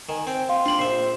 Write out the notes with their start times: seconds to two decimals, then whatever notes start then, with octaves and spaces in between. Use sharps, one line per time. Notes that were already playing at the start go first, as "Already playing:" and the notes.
0.09 D#3 G#5
0.27 C4 G5
0.49 F5 C6
0.66 D4 F4 G4 F#7
0.79 A#1 C5 E5 C7